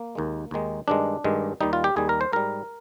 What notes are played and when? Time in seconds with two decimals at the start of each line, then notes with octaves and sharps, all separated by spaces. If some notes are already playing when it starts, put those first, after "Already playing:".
Already playing: A#3
0.15 D#2 D#3 G#3
0.51 D#2 D#3 G#3
0.88 G2 D#3 G#3 D4
1.24 G2 D#3 G#3
1.61 D#2 D#3 G3 D#4
1.73 F4
1.84 G4
1.96 D#2 D#3 G3 G#4
2.09 A#4
2.21 C5
2.33 G#2 G3 A#4